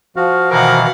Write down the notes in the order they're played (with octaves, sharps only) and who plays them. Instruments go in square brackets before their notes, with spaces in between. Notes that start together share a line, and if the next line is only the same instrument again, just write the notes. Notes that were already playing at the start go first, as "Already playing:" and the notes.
[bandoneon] F3 F#4 [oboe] F5
[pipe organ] B2 D#3 E3 [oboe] A#4 [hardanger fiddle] F5 F#5